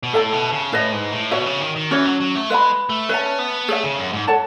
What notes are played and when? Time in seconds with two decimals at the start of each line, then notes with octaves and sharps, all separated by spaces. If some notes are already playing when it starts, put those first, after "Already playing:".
0.03 B2
0.13 A2 A4 E5 A5
0.33 B2
0.52 C#3
0.72 A2 E4 B4 D#5
0.92 G#2
1.12 A2
1.31 B2 F#4 C#5 E5
1.46 C#3
1.61 D#3
1.76 D#3
1.91 E3 C#4 F#4 C#5
2.05 F#3
2.20 F#3
2.35 A3
2.50 G#3 B4 E5 B5
2.89 A3
3.09 C#4 B4 E5 A5
3.39 B3
3.68 A3 G#4 C#5 E5
3.84 C#3
3.99 F#2
4.13 G#2
4.27 A4 C#5 F#5 A5